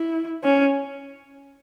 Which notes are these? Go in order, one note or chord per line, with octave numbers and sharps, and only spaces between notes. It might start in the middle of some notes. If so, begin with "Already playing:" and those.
Already playing: E4
C#4